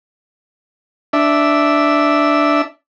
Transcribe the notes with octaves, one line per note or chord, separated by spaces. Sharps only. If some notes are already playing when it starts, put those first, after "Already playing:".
D4 E5